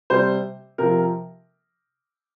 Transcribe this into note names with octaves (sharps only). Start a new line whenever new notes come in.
C3 G3 C5
C3 F3 A#4